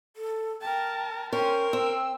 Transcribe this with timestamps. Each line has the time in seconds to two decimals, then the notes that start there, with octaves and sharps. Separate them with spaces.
0.16 A4
0.62 A#4 G5 A5
1.33 C#4 A#4 C5 G5
1.73 C4 E6